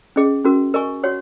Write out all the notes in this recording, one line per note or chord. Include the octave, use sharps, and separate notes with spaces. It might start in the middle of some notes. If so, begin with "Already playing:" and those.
C#4 G#4 D#5
C#4 F#4 A#4
A#4 D#5 G#5 C#6
F#4 C#5 F#5